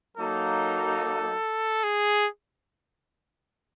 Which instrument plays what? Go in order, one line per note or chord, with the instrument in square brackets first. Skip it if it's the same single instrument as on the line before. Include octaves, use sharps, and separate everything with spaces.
[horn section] F#3 A#3 D#4 [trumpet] A4
[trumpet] G#4